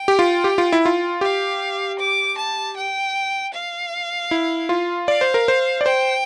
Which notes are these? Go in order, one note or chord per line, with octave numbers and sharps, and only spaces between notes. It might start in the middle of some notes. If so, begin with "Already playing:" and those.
Already playing: G5
G4
F4
G4
F4
E4
F4
G4 F5
D6
A5
G5
F5
E4
F4
D5 F5
C5
A#4
C5
D5
C5 G5